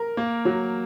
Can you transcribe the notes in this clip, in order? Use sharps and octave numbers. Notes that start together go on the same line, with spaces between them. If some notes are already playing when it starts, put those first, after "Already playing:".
Already playing: A#4
A#3
F#3